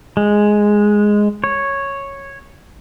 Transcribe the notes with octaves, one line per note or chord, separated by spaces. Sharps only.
G#3
C#5